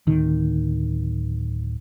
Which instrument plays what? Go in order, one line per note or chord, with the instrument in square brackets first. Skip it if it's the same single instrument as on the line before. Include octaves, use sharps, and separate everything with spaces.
[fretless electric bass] D1 D#3